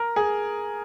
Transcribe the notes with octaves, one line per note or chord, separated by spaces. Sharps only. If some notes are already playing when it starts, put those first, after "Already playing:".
Already playing: A#4
G#4